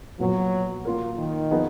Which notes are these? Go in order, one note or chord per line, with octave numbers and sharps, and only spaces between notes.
A#2 F3 F#3 B3
A#3 F4 A#4
D#3
F3 B3 D#4 G#4